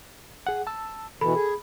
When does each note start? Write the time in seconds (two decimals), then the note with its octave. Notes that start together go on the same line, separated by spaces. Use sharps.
0.47 G#4 F#5
0.67 A5 E6
1.21 B2 E3 A4 B5
1.34 G#4